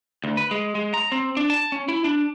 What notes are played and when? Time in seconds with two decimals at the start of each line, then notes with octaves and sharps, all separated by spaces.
0.24 D2
0.37 B4
0.51 G#3
0.75 G#3
0.94 A#5
1.12 C4
1.37 D4
1.50 A5
1.72 C#4
1.88 E4
2.04 D4